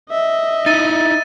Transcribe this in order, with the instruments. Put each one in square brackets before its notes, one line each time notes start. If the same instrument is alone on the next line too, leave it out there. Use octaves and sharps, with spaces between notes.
[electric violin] D#5 E5
[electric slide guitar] D#4 E4 [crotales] A6 D#7